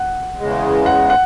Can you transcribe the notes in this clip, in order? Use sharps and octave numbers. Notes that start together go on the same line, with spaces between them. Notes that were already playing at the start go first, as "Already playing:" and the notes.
Already playing: F#5
E2 C#3 G#3
F#5
F#5